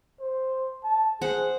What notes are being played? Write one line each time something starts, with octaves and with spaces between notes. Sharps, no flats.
C5
A5
G#4 C5 F#5